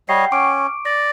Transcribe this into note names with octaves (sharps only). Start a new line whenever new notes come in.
G3 C#5 D#5 F#5 G5 C7
C#4 C#6 D6 D7
D5 A#6